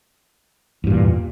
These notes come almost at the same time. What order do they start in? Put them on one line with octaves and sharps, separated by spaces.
E2 G2 A#2